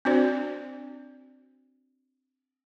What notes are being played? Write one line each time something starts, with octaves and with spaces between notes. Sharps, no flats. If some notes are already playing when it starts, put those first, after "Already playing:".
C4 D4 F#4 C5 D5